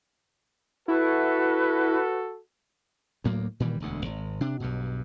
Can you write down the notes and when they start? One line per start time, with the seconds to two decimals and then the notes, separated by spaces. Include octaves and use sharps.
0.88 E4 F#4 A4 B4
3.24 D2 A2 F#3 A#3
3.60 A#2 D#3 E3 G3
3.80 E1 D2 D3
4.05 G#1
4.41 C3 D4
4.60 B1 G2 B2